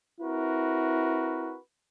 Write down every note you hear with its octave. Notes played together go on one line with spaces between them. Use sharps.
C4 E4 F#4 A#4 B4